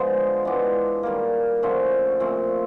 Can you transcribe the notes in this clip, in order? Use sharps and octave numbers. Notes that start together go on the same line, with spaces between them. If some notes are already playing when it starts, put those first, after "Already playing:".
Already playing: D3 F3 G#3 B3
E3 G#3 B3 D4
D#3 G3 A#3
D3 F3 A3 C#4
A#2 F3 A3 C4